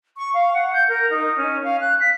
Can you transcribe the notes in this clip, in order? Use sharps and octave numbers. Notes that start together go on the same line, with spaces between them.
C#6
F5
F#5
G6
A#4
D#4
C#4
F5
F#6
B6